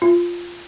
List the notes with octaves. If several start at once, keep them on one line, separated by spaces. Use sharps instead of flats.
F4